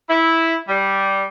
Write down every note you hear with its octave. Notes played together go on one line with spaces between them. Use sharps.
E4
G3